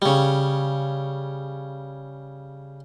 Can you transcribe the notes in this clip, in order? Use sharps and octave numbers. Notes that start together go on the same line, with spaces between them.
C#3 G3